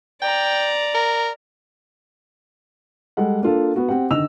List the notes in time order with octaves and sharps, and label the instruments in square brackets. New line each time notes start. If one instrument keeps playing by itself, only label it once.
[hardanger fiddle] D5 A#5 [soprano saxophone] G5
[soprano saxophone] A#4
[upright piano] G3 G#3 A4 F#5
A#3 D4 F4 A4
B3 F#4
C4 G4 F#5
D3 D#3 D#5 E6 F7